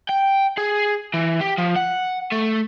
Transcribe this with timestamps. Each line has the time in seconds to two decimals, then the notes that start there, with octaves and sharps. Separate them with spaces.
0.09 G5
0.57 G#4
1.14 E3
1.41 G4
1.58 F3
1.76 F#5
2.32 A3